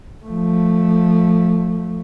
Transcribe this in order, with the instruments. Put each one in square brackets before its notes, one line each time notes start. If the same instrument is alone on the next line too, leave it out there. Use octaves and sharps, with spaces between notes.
[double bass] F3 A3